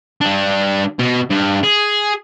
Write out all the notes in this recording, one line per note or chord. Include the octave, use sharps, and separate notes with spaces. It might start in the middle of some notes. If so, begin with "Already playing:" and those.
G3 D4
B2
G2
G#4